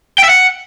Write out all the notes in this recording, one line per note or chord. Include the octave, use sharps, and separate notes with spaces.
G5
E5
F#5